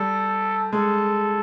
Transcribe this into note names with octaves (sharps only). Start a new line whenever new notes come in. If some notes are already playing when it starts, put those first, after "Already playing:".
Already playing: G3 A4
G#3 A4